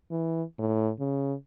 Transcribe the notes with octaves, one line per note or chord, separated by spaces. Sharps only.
E3
A2
C#3